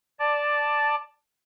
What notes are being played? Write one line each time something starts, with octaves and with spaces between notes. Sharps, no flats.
D5 A5